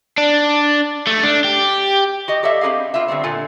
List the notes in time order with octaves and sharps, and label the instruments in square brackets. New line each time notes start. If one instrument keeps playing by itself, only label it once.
[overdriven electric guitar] D4
A3
D4
G4
[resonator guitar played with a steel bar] F#4 G4 D#5
G4 A4 C#5 D5 E5 F5
C4 D#4 G4 G#4 F5
B3 F4 E5
D3 G3 A3 C4
A#2 D3 F4 A4 G#5